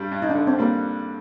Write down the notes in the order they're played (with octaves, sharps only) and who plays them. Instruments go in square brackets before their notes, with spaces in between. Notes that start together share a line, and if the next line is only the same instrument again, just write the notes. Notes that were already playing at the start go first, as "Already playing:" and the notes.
Already playing: [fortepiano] G2 G3
G2
[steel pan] D#4
D4
[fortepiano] D3
[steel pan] C4
[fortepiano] G3 [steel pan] A#3